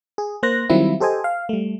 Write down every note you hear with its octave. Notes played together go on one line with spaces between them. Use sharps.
G#4
A#3 C5 F#6 A#6
D#3 F#3 G3 C4 E4 F4
G4 A4 C5 D#5 G#5
F5
G3 A3